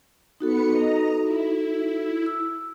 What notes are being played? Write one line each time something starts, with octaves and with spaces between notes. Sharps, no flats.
B3 D#4 F#4 A4 B4 C#7
D#5 A#5
E4
E6